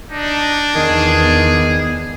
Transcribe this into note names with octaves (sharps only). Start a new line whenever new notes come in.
D4 D#4
E2 D#3 B3 G#4